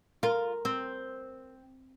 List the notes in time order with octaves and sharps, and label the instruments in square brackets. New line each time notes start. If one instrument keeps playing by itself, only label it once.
[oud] F4 [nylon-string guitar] A#4
[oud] C4